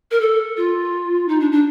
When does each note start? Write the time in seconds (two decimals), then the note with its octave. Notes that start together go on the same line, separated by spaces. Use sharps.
0.11 A#4
0.21 A4
0.57 F4
1.28 D#4
1.40 D4
1.52 D4